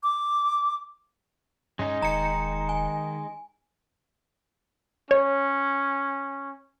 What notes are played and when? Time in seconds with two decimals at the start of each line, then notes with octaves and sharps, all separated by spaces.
0.03 D6
1.79 G2 G#3 C#4 D#4
2.02 E1 D#3 A#5 C#7
2.69 G#5
5.11 C#4 C#5